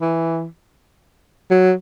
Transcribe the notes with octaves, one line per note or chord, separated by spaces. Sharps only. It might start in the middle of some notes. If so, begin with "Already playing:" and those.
E3
F#3